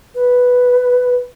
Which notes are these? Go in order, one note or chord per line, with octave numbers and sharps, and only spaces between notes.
B4